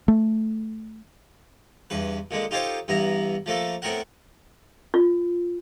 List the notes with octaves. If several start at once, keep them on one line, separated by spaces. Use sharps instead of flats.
A3
E2 G2 B4
A#2 D3 G#3
D#4 F4 G4 A4 C5 C#5
G2 E3 B3 E4 A#5
F3 A3 A#3 A4
A2 B3 C4 A#4 F#5
F4